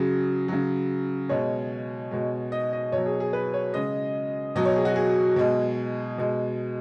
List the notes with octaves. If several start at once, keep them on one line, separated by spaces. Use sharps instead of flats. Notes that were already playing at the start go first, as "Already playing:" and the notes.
Already playing: C#3 F#3 G#4
C#3 F#3
B2 G#3 C#5
B2 G#3
D#5
D#5
B2 F#3 C#5
G#4
G#4
B4
C#5
C#3 G#3 D#5
B2 F#3 D#5
C#5
G#4
F#4
G#4
B2 G#3
B2 G#3